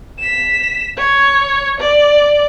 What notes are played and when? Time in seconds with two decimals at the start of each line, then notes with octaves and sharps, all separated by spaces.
0.19 B6 E7
0.97 C#5
1.80 D5